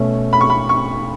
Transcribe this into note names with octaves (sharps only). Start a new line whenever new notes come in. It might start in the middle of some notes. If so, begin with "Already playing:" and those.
Already playing: B2 A3 C#4
B5
C#6
B5
C#6